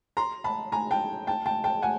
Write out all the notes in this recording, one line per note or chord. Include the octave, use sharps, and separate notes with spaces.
A#5 C6
A5 B5
G#5 A#5
G5 A5
G5 A5
G5 A5
G5 A5
F#5 G#5